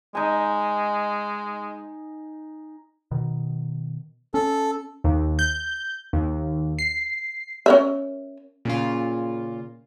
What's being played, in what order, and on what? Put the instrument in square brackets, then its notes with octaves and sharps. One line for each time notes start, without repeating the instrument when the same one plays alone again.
[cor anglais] G#3 [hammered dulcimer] D#4 G#5
[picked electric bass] B2 D#3
[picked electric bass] C#4 [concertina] A4
[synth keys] D#2
G6
D#2
C7
[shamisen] C#4 A#4 E5
[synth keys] A#2 C#3 F4